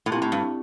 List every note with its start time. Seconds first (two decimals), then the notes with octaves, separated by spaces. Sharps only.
0.06 A2
0.12 A#2 C4 E4 G4
0.22 A2
0.32 G2